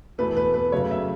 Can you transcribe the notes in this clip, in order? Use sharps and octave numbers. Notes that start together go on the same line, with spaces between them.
E2 B2 A3 B4
B4
B4
F#2 C#3 F#3 A3 C#5
E5